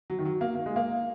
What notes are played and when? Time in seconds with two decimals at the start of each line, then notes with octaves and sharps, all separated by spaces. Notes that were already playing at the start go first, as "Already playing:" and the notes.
0.10 F#3
0.19 D#3
0.25 F#3
0.41 A#3
0.55 A#3
0.66 G#3
0.76 A#3